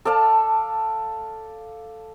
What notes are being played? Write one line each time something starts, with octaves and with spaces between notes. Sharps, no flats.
A4 D5 F5 A5